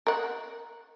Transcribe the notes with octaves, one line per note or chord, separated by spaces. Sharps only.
A#4 F#5